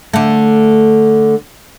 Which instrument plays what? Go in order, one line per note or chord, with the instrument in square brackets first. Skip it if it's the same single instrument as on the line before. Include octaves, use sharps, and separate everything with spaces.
[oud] D3 A3